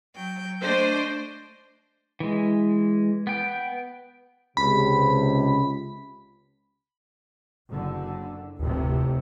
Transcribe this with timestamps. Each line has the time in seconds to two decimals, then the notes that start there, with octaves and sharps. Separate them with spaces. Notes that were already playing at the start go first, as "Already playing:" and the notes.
0.15 F#3 G5
0.62 A3 D4 C5 D#5
2.20 E3 G#3
3.27 B3 G5
4.57 C#2 C3 B5
7.70 F#1 D3
8.59 F1 D2 A2 C3